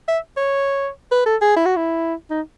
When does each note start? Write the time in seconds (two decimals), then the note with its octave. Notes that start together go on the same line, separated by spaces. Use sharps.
0.08 E5
0.37 C#5
1.12 B4
1.26 A4
1.42 G#4
1.56 E4
1.66 F#4
1.76 E4
2.30 D#4